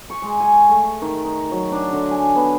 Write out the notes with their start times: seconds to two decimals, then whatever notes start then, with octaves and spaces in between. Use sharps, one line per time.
0.10 C#6
0.22 G#3
0.40 G#5
0.69 A3
1.02 D#3
1.25 D#4
1.51 F#3
1.72 D4
1.92 D3
2.11 G#5
2.36 B3